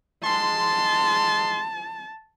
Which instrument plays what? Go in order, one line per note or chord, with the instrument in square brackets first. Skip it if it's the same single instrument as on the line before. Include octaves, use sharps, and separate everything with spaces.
[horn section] G#2 G#3 C6 [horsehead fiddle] A5